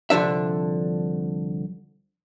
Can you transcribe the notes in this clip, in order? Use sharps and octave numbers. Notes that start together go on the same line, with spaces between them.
C2 D3 F3 D4 E5